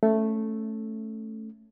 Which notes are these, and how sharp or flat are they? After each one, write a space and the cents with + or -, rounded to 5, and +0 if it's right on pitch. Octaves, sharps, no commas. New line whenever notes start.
A3 +0 C#4 +0